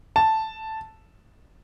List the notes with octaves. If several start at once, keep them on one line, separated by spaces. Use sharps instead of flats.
A5